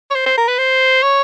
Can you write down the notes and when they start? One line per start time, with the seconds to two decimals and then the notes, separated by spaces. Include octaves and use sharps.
0.11 C#5
0.15 C5
0.26 C5
0.37 A#4
0.48 B4
0.59 C5
1.02 C#5